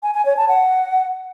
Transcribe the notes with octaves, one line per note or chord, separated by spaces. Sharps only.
G#5
G#5
C#5
A5
F#5